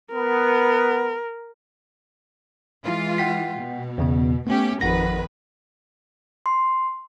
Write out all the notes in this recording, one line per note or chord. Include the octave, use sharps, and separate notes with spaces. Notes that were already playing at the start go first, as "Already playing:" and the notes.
B3 A#4
E3 G#3 F4
F#5 G5 B6
B2
E2 C#3 B3
A3 B3 C#4 G4
G#1 F2 D#3 B4 F#5 A#6
C6